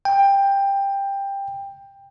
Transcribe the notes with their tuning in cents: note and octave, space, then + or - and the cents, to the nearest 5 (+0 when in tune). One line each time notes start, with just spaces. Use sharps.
G5 +15